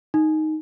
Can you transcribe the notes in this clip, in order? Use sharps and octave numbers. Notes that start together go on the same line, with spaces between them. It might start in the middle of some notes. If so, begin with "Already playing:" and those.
D#4